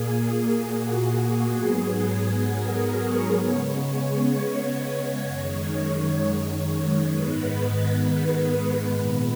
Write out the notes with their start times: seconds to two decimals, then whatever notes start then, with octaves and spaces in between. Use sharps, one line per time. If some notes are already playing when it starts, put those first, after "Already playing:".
Already playing: A#2 A#3 G#4
0.11 G#4
0.58 F#4
1.04 G#4
1.51 G#2 F#3 B3 G#4
2.45 A#4
2.91 C#5
3.37 C#3 G#3 B3 C#5
5.23 F#2 D#3 G#3 C#5
7.10 G#2 D#3 G#3 B3 B4
7.57 B4
8.03 B4
8.96 A#2 G#3 B3 B4